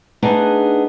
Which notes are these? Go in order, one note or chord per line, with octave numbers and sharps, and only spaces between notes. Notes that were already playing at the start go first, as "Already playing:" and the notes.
A3 B3 D4 D#4 G#4